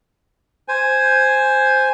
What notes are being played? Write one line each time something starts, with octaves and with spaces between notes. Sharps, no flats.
C5 G#5